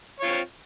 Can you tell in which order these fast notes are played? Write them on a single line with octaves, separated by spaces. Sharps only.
C#5 F4 C4